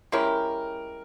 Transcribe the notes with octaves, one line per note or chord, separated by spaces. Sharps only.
G#3 C#4 E4 G4 A#4